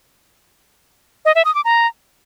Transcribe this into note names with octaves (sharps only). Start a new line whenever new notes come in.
D#5
E5
D#6
D6
A#5